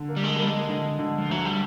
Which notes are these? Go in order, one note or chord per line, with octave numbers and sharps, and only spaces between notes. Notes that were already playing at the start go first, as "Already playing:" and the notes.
Already playing: D3
A#3
G3
G#3
G3 A#3
G#3
D3
D3
F3
D2 F#3
G3